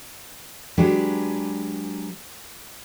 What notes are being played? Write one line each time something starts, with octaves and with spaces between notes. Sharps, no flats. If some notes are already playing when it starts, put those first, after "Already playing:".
F#3 G#3 D4 G4 G#4 B4